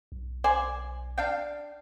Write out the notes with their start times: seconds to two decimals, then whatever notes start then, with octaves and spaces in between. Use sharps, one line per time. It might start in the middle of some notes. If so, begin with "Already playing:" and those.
0.12 B1
0.44 C5 D5 G#5
1.18 D4 F5 G5